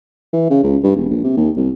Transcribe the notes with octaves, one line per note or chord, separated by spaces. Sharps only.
E3
C#3
C#2
G2
E1
A#1
C3
D#2
C2